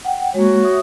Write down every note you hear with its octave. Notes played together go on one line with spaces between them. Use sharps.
F#5 G5
G#3 A#3 F#4 C#5
E5 D#6